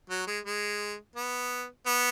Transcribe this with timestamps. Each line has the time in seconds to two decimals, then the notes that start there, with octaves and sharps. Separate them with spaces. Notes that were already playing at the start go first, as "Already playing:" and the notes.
0.10 F#3
0.27 G#3
0.45 G#3
1.16 B3
1.86 B3